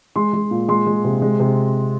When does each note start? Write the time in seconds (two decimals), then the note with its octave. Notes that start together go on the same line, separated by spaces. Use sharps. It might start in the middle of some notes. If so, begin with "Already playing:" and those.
0.16 G#3 C6
0.33 G#3
0.51 A#2
0.68 G#3 C6
0.86 G#3
1.04 C3
1.22 G#3
1.40 C3